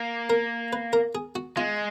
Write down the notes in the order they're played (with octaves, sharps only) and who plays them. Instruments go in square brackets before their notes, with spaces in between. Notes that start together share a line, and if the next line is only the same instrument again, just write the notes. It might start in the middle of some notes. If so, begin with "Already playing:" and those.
Already playing: [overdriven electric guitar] A#3
[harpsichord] A#4
B4
A#4
G#4
F#4
[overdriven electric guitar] G#3 [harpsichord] F4